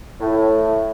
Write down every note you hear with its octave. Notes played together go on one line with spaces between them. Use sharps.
A2